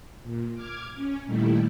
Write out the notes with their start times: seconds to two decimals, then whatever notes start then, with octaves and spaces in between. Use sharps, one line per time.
0.23 A#2
0.54 D6 F6 G#6
0.95 C#4
1.25 A#2 D#3 G3 A3 E4